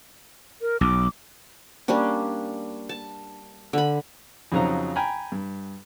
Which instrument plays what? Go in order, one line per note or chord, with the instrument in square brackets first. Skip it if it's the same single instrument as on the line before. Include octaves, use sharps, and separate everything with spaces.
[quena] A#4
[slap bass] B1 [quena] D6
[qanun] G3 A#3 C#4 D4
A5
D3 B5
[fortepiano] F2 C#3 F#3 D#4 C5 A#5
G5 G#5 A#5 B5
G2